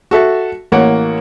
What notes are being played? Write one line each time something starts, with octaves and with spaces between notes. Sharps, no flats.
F#4 A4 E5 A5
A1 A#3 C#5 F#5